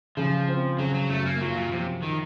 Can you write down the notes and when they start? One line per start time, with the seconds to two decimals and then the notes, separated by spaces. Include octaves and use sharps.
0.17 C#3 F3
0.48 C4
0.78 C#3 F#3
0.94 F#3
1.09 F#2 A3
1.25 A#3
1.41 F#3 F4
1.56 A#2
1.72 C3 F3
2.02 D#3 D#4